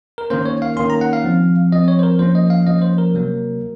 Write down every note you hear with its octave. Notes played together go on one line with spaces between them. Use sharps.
A#4
D#3 A#3 C#4 C5
C#5
F5
D#3 A#3 C#4 C6
A#5
F#5
F5
F3 C4
F3 C4 D#5
C#5
C5
A#4
F3 A#3 C#4 C5
D#5
F5
F3 A#3 C#4 D#5
C5
A#4
C3 F#3 A#3